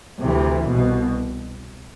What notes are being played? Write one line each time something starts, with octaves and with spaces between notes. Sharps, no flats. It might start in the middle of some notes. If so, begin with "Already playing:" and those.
D2 C3 E3
C2 B2